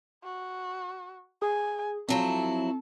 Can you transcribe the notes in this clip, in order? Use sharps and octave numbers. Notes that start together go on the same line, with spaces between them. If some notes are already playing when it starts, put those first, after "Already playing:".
F#4
G#4 G#5
F3 F#3 C4 E4 A4